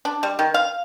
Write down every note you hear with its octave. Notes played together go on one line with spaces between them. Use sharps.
D4
G3
D#3
F5